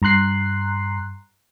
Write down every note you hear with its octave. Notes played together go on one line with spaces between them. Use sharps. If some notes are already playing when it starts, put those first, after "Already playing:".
G2 A#5 C6 F#6 C7